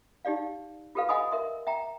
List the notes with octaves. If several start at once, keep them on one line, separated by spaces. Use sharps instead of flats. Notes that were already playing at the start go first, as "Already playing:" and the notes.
D#4 G4 D5 F5
F4 G4 A4 B4 F5
D#5 F#5 G#5 B5 C6 D#6
A#4 E5 C6
E5 G5 A#5